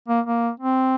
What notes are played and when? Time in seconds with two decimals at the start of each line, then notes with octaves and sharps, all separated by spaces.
0.08 A#3
0.26 A#3
0.60 C4